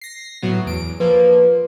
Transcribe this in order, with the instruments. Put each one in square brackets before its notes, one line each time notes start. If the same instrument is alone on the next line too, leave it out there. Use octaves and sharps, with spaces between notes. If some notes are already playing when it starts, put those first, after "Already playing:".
[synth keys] A#6 C7
A2 F#3 B3
E2 D7
[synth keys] F3 A#3 [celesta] B4